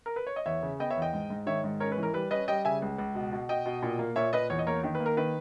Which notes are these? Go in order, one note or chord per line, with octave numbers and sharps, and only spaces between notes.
A#4
B4
C#5
D#5
E2 C#5 E5
C#3
B3 D#5 G5
C#5 E5
E2
D#5 G5
G#2
G#2
D#3 C#5 E5
G#2
C#4 A#4 C#5
B4
E3
A#4
G3 B4
C#4 B4 D#5
G3 D#5 G5
C#3 E5 G#5
C#2
C#2
B2
B2
B2 D#5 G5
B2
A#2
A#3
A#2 C#5 E5
A#2 B4 D#5
E2 C#5
D#5
A#3 A#4 C#5
D#3
B4
A#3
A#4
D#3 B4